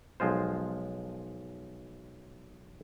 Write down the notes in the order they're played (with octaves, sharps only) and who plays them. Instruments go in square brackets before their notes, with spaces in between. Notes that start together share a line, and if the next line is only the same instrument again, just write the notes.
[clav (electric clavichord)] B1 F3 G#3 F4 C5